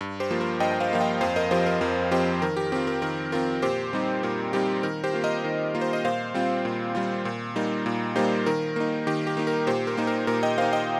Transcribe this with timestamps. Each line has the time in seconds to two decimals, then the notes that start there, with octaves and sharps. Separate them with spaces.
0.01 G2
0.20 G4 C5
0.31 F3 A#3 F4
0.41 A#4
0.60 G2 D#5 G5
0.72 G5
0.80 C5 F5
0.91 F3 A#3 F4 F5
1.01 D#5 G5
1.21 F2 C5 F5
1.36 A#4 D#5
1.51 F3 C4 G4 C5
1.66 A#4
1.81 F2 A#4
2.11 F3 C4 G4 C5
2.42 D#3 A#4
2.57 G4
2.72 C4 F4 G4
2.87 A#4
3.02 D#3 A#4
3.32 C4 F4 A#4
3.62 A#2 G4 C5
3.93 G3 C4 D#4
4.23 A#2 A#4
4.53 G3 C4 D#4 G4
4.83 D#3 A#4
5.04 G4 C5
5.13 A#3 F4
5.24 A#4 D#5
5.44 D#3
5.75 A#3 F4
5.81 C5
5.93 D#5
6.05 A#2 C5 F5
6.34 G3 C4 F4
6.65 A#2
6.95 G3 C4 F4
7.25 A#2
7.56 G3 A#3 D#4
7.86 A#2
8.16 G3 A#3 D#4 G4 C5
8.46 D#3 A#4
8.76 A#3 D#4
9.07 D#3 G4
9.27 G4
9.37 A#3 D#4
9.47 A#4
9.67 A#2 G4 C5
9.87 A#4
9.97 A#3 D#4
10.07 A#4
10.27 A#2 A#4
10.43 D#5 G5
10.58 A#3 D#4 C5 F5
10.73 D#5 G5